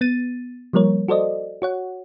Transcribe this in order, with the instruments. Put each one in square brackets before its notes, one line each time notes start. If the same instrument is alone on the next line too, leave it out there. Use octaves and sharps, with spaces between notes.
[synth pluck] B3 A6 D#7
F3 G3 A#3 A#4 C#5
F#4 A4 C5 D5 D#5
F#4 C#5 F#5